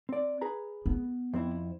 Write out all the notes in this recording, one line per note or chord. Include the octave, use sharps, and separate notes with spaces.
C4 D5
G#4 B4 A#5
B3
F2 C4 E4